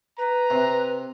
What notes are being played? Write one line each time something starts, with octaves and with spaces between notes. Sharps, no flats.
B4 A#5
C3